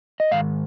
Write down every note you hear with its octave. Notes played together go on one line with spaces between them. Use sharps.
D#5
G#2 D#3 F5